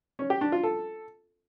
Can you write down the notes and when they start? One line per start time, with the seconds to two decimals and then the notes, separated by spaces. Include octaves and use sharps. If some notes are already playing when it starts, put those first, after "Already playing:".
0.19 C#4
0.30 G4
0.41 D4
0.52 F4
0.63 A4